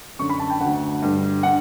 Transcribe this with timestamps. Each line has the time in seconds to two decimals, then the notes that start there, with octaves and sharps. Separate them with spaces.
0.19 F#2 D3 C#6
0.29 B5
0.39 A5
0.50 G5
0.60 D2 D3 F#5
1.02 G2 D3
1.43 F#5
1.46 D3